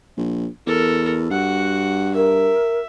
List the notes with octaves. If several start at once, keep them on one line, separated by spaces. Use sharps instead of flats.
A#1
E2 A4 A#4
G2 F#4 F#5
A#4 E5